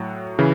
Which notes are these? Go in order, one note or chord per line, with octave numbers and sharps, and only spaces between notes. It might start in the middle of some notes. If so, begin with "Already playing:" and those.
Already playing: A2 F#3
C#3 E3